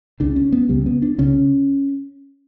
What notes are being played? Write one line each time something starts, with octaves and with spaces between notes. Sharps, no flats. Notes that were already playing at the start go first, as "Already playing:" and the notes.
C#2 C#3 D4
C#4
B3
C#2 C#3 G3
B3
D4
C#2 C#3 C#4